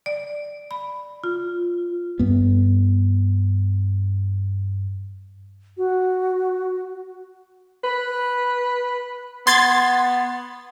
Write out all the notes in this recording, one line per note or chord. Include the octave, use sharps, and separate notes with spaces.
D5
B5
F4
G2 B3
F#4
B4
B3 C6 G#6 A6